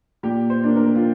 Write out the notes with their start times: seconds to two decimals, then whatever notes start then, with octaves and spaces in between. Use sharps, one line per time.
0.23 A#2 G4
0.50 C5
0.64 A#3 D4
0.76 A#4
0.95 F4